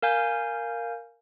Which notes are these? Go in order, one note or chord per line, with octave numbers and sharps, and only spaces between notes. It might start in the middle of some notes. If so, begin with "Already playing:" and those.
A#4 F5 G#5 G6